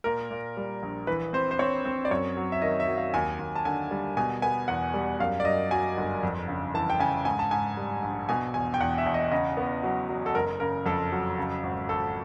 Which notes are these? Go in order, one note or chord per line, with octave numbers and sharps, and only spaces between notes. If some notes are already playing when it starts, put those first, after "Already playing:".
A#2 A#4
A#2
G3
A#1
E3 B4
C4 C5
C5
C4 C#5
C4
D5
F#2 C#5
F#3
E5
D#3 D#5
E5
F#3
F5
D#2 G#5
D#2
A5
D3 G#5
G3
B2 G#5
B3 G#5
E2 F#5
G3
F#2 F5
D5
F#2 D#5
F#3 G#5
G1
F2
C#3
E3 A5
G5
C#3 G#5
G#2 G#5
A5
G#2 G#5
G3
A#1
B2 G#5
E2 G#5
G5
E2 F#5
E5
E2
D#5
C#3 D#5
B3
F#3
F#3
A4
F#1 A#4
C#3 A#4
F2 A4
F#3
C#3
G#1
G#1 A4